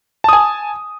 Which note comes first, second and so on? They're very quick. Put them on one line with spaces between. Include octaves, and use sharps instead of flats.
A5 D#6 G#5